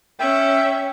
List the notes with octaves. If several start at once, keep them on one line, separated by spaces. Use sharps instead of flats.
C#4 E5 G5